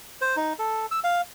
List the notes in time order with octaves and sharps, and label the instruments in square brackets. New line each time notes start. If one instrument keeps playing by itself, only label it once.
[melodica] C5
D#4
A4
E6
F5